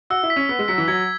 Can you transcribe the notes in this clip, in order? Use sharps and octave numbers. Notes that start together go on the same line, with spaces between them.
F#4 E6
E4
B6
C#4
B3 B6
G#3
F#3 B6
E3
F#3 G#6